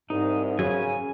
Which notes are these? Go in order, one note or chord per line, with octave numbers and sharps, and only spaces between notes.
C2 G#2 D#4
F#2 C#3 G#5